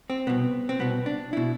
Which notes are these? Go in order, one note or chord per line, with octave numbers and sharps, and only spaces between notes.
C4
C2 B2 B3
C4
C2 B2 B3
D4
B2 E4